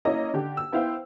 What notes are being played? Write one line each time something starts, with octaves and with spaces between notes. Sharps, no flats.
A#3 C#4 E4 D#5
D3 G4
E6
B3 E4 C5 F5 G5